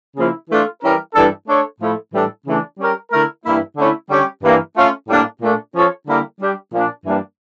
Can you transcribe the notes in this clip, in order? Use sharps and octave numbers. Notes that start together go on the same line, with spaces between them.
C#3 F3 A#3 E4
E3 A3 D4 F4
E3 G3 C#4 E4 A#4
G2 E3 G3 D4 A4
A3 D4 A4 C#5
A2 F3 A3 E4
A2 E3 G3 D4 A4
C#3 E3 A3 D4
G3 C#4 G4 A#4
D3 A3 E4 A#4
G2 E3 A#3 E4
D3 A3 C#4 E4
D3 G3 C#4 G4 C#5
G2 E3 A#3
A3 C#4 F4
A2 G3 A#3 D4
A#2 A3 D4
F3 C#4 F4 A4 C#5
D3 G3 A#3 E4 A#4
G3 D4 G4
A#2 F3 A#3 D4
G2 E3 G3 A#3 D4